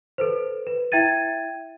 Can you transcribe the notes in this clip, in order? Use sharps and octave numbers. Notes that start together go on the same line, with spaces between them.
A4 B4 C5
B4
E4 E5 G5 G#6 A6 D#7